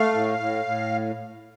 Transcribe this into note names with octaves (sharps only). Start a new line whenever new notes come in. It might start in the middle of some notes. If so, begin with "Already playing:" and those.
Already playing: A3 F5
A2
A2
A2